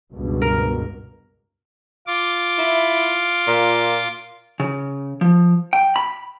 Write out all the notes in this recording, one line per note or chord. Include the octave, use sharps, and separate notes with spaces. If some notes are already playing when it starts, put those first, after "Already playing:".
C#2 G2 B2
A#4
F4 D6
E4
A#2
C#3
F3
G5
B5